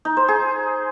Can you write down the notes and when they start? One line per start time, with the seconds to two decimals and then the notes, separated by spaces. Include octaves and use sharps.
0.05 D#4
0.17 C5
0.28 G#4